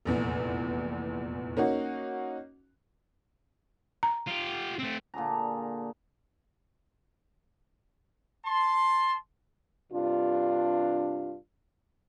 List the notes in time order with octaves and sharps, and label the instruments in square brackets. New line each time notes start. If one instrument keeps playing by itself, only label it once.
[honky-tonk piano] F1 A#1 E2
A#3 C#4 D#4 F#4
[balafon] A#5
[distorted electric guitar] F4 G4
A3 C4
[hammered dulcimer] A#2 D3 G#4 A#5
[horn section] A5 C6
[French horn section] G2 C3 D4 F4